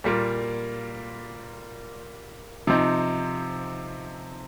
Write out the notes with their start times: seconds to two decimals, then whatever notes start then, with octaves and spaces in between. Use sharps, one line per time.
0.04 A#2 G3 A#3 F4
2.67 C3 F3 C4 D#4